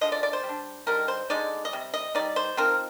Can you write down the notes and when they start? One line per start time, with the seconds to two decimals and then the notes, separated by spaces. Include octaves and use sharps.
0.01 D3 F3 G#3 D#5
0.12 D5
0.23 D5
0.33 C5
0.43 G3
0.49 D4
0.86 D3 G3 C4 D#4 A#4
1.08 C5
1.30 D3 G#3 D#4 D5
1.65 D#5
1.73 C3 G3
1.94 D#5
2.15 G3 A#3 D#4 D5
2.36 C5
2.57 F3 C4 D#4 A#4